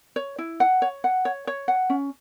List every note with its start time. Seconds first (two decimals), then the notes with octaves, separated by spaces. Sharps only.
0.16 C#5
0.38 E4
0.60 F#5
0.82 C#5
1.04 F#5
1.25 C#5
1.47 C#5
1.68 F#5
1.90 C#4